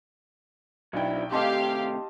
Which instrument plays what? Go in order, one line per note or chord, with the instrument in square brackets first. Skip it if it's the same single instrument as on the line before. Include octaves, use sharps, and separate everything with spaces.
[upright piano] B1 G5 [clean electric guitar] F#3 D4 E4
[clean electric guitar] C3 D#3 A3 [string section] G4 F5 [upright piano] D#5 A5 C6